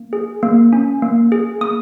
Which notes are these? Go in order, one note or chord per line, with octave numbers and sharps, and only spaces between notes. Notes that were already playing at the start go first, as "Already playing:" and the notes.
Already playing: A#3
G#4
A#3
C#4
A#3
G#4
A#3 D#6